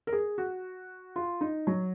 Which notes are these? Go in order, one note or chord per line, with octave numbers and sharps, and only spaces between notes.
A#4
G#4
F#4
F4
D#4
F#3